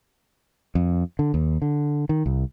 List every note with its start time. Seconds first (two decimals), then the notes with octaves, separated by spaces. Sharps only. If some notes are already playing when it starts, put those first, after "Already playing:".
0.75 F2
1.19 D3
1.34 D#2
1.62 D3
2.09 D#3
2.26 C2